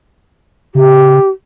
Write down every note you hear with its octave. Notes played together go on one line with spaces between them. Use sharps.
C#3 G4